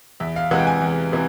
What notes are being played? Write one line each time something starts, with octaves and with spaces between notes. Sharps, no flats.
E2 E5
F5
C3 E3 G#3 F#5
G5
G#5
E2
C3 E3